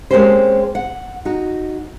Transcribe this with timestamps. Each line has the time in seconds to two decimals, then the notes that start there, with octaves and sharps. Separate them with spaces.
0.11 G#3 A#3 C4 C#4 G4 C5
0.75 F#5
1.25 D#4 F#4